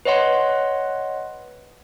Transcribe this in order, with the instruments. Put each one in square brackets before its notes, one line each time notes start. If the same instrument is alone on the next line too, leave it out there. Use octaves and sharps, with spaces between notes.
[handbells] B4 C#5 D#5 F#5 C6